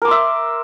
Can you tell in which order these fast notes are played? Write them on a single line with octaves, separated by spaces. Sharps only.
A#4 D6 C6 E5